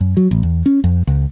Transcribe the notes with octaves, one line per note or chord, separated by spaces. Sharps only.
F#2
F#3
A1
E2
C#4
F2
C#2